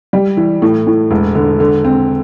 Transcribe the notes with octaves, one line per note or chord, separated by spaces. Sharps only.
G3
E3
A2
A2
E1
D3
D3
C4